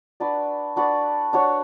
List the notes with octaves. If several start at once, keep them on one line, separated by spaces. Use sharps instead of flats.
D4 F#4 B4 D5
D4 F#4 B4 D5
D4 F#4 C#5